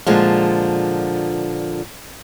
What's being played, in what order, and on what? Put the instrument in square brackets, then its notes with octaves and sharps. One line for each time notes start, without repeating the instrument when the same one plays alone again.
[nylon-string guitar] A#2 D3 F3 G#3